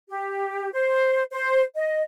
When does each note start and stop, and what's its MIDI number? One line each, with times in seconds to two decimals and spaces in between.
0.09 0.69 67
0.72 1.22 72
1.31 1.61 72
1.75 2.01 75